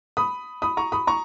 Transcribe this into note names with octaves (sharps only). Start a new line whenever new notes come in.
B5 D#6
B5 D#6
A#5 C#6
B5 D#6
A#5 C#6